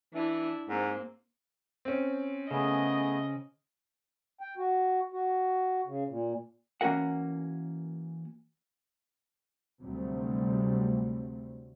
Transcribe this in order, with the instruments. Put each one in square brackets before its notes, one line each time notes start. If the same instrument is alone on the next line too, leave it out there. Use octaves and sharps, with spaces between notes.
[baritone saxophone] E3 [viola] D4 E4
[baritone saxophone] G#2 [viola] A#3 C4
[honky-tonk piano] C4 C#4
[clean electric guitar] C#3 [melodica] A3 B3 G#4 [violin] D#5
[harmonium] G5
F#4
F#4
C#3
A#2
[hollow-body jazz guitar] E3 A#3 C#4 F#4 A#4 F#5
[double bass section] D2 C3 F#3 G3 A3 C4